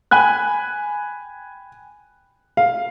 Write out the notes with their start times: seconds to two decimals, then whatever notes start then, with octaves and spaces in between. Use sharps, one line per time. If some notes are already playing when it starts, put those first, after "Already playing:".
0.11 G5 G#5 B5 F#6
2.57 F5